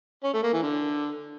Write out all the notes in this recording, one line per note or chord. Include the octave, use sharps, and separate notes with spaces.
C#4
A3
A#3
E3
D3